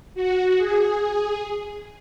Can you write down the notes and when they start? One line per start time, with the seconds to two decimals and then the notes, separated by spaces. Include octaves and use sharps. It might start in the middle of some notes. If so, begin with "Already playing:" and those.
0.14 F#4
0.58 G#4
0.99 G#4